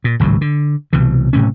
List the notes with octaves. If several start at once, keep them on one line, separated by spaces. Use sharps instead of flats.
A#2
G#1 C#2 A2 F#3
D3
C2 B2 E3
F#1 A2 C3 C#4